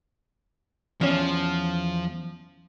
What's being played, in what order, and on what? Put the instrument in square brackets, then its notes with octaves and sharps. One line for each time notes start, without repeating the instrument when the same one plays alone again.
[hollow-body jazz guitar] E2 C#4 [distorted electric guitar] F3